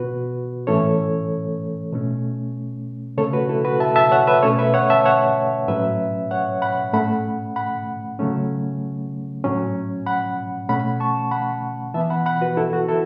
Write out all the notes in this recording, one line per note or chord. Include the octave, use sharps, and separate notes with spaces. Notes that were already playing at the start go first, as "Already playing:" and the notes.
Already playing: B2 B3 F#4 B4
A2 E3 A3 C#4 A4 C#5
B2 A3 C#4
C#3 A3 C#4 A4 C#5
F#4 B4
E4 A4
F#4 B4
E5 A5
E5 A5
C#5 F#5
B4 E5
B2 A3 C#4 A4 C#5
B4 E5
C#5 F#5
E5 A5
C#5 F#5
A2 F#3 C#4 B4 E5
C#5 F#5
F#5 B5
A2 A3 C#4 F#5 B5
F#5 B5
C#3 F#3 A3 C#4
A2 F#3 C#4
F#5 B5
B2 A3 C#4 F#5 B5
A5 C#6
F#5 B5
E3 B3 E5 A5
F#5 B5
F#5 B5
F#4 B4
E4 A4
F#4
E4 A4